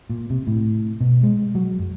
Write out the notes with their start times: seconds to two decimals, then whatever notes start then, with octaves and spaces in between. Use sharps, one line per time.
0.10 A#2
0.30 C3
0.47 A2
1.00 B2
1.23 G#3
1.55 F#3
1.79 F#2